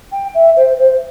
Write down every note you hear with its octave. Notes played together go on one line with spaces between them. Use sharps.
G5
E5
C5
C5